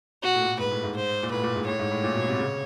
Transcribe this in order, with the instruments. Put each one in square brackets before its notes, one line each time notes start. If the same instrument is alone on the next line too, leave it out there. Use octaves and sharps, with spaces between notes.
[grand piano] B2 [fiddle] F#4
[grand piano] A2
A#2
A2
[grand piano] G#2 [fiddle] B4
[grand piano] A2
G#2
[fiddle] C5
[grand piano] A#2
[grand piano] A2 [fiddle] B4
[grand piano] A#2
G#2
[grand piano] A2 [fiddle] C#5
[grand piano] G#2
A2
A#2
B2
C3
C#3